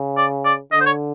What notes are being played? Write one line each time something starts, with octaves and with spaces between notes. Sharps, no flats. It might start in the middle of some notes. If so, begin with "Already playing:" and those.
Already playing: C#3
D5
D5
D3 D#5
C5
C#5